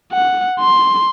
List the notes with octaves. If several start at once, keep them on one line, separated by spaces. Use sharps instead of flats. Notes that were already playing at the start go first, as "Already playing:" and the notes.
F#5
C6